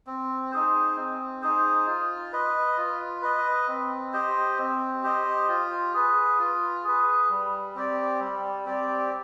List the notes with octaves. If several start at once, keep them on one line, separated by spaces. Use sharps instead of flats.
C4
D#4 G#4 C5
C4
D#4 G#4 C5
F4
B4 D#5
F4
B4 D#5
C4
G4 C5 D#5
C4
G4 C5 D#5
F4
G#4 B4
F4
G#4 B4
G3
C4 G4 D5
G3
C4 G4 D5